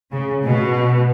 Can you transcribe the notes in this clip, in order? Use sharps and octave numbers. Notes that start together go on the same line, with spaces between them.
C#3
B2